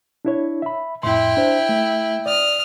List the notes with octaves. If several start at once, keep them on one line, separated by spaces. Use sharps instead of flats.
D4 E4 C#5
E5 B5
F2 A2 E4 G5 C6
D4 C5
A3
D5 D#6 F6